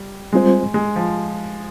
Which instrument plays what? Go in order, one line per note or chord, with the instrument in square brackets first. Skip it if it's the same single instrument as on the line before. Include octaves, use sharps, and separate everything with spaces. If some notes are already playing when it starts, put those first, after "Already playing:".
Already playing: [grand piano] G3
[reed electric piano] G3 C4 F4 C5 [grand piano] G#3
[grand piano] G#3
F3